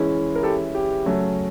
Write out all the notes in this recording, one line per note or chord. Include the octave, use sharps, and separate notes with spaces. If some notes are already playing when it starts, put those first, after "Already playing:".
Already playing: E3 G#3 C#4 E4
A#4
G4 A4
G4
C#3 F#3 A3 C#4